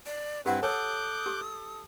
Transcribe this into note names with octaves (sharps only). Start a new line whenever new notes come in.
D5
G2 C4 E4 G4 B4 F#5
A4 C#5 D6 D#6 F#6 G6
G4